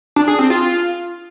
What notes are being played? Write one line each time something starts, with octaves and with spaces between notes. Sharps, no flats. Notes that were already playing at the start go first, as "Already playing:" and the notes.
D4
G#4
C4
F4